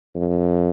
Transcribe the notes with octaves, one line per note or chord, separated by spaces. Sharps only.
F2